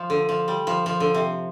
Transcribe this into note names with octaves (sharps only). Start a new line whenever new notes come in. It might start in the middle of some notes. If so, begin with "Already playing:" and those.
Already playing: F3
D3
F3
G3
F3
F3
D3
C3